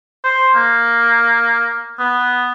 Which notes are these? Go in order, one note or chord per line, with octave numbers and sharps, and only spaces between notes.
C5
A#3
B3